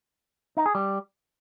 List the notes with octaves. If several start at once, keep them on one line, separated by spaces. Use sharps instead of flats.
D#4
G#4
G3